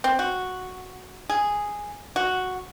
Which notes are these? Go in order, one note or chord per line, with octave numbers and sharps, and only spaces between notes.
C4
F#4
G#4
F#4